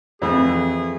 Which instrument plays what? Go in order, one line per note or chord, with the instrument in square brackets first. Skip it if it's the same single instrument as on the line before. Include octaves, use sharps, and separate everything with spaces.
[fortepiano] F2 E3 [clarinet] G#4